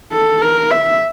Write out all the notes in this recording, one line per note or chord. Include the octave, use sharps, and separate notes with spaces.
A4
A#4
E5